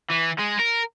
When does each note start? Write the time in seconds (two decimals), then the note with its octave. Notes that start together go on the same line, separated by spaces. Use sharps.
0.10 E3
0.38 G#3
0.59 A#4